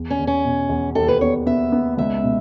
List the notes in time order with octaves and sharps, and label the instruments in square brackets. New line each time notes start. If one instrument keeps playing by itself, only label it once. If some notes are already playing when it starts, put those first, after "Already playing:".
Already playing: [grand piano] E2
[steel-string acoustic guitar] C#4
[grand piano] E2
[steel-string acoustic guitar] C#4
[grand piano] B2
E2
[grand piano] D#2 [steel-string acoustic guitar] A4
[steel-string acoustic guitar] B4
[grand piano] B3 [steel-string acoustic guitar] C#5
[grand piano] B3 [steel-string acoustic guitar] E5
[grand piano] B3
[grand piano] C#2 [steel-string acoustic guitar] E5
[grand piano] B2